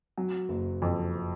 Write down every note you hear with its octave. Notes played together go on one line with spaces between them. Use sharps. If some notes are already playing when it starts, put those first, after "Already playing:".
F#3
F#1
F2